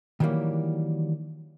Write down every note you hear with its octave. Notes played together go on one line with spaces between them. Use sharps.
D#3 E3 F#3 G3 A#3